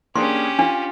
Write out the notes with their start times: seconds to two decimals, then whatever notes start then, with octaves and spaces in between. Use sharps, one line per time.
0.15 A#3 C#4 D4 G4 G#4 C6
0.59 D4 F4